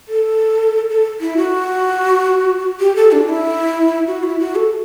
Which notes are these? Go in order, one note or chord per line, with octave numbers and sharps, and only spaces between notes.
A4
A4
E4
F#4
G4
A4
D4
E4
F#4
E4
F#4
A4